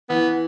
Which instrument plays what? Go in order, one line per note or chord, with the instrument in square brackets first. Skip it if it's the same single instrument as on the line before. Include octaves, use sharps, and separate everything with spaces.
[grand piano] E3 [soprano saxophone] B3